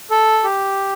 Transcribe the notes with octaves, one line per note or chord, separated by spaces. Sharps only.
A4
G4